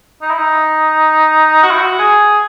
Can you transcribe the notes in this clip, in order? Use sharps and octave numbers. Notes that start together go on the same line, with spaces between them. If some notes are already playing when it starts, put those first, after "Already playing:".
D#4
E4
D#4
F#4
E4
F#4
G#4